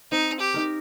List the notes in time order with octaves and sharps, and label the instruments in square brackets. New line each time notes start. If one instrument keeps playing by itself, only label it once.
[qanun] C4 [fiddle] D#4
[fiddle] G4
[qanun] D#4 A#4